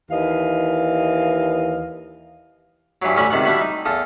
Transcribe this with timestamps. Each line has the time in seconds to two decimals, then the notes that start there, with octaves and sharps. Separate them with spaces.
0.11 D#2 E3 D#5 F5
3.02 G2 E3 F#3
3.16 A1 D2 C#4 D5 E5 B5
3.30 C#2 C3 D#3 D5 F#5
3.45 G3 D4 E4 F#4
3.61 D#4
3.85 E2 F4 A4 A5 D#6